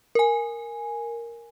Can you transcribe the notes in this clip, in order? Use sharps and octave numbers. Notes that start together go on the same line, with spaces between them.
A#4 G#5